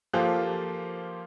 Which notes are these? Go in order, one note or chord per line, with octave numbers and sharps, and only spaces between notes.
F3 A#3 F4 G4 A4 C5